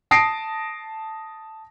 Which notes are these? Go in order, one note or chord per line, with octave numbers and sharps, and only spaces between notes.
A5 D#6 A#6 C7 D7